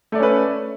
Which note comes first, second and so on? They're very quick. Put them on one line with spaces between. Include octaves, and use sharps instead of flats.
A3 D5 C#5 C#4 B4